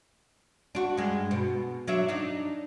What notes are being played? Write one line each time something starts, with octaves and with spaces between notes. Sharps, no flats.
D4 F#4
G2 G#3
B2
F#3 D4 E5
D4 D#4